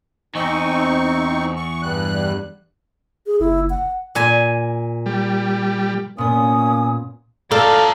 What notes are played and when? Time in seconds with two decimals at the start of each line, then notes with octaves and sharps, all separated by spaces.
0.35 E2 C4 D#4 C#6
1.56 C#6
1.82 G2 G3 F#6
3.27 G#4
3.40 F#1 E4
3.70 F#5
4.15 A#2 G#5
5.06 G3
6.18 A#2 A#3 B3 C#4 G#5 D#6
7.52 F3 D#4 A4 D5 F5